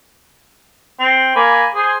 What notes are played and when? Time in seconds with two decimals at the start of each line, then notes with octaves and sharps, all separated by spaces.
1.00 C4
1.36 A#3 G#5 B5
1.75 G#4 C5